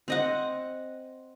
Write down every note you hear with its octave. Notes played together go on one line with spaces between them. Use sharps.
C4 D#5 F#5